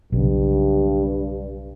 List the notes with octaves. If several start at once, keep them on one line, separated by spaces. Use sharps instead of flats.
B1 G2 C#3